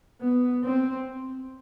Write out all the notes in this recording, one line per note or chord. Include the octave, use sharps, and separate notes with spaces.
B3
C4